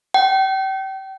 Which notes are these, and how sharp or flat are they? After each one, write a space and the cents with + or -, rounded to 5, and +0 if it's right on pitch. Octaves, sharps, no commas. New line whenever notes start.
G5 -35